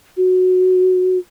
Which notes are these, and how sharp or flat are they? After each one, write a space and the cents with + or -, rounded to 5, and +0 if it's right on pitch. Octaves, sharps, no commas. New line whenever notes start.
F#4 -10